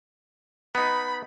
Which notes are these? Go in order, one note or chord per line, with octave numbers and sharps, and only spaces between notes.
B3 D#4 B5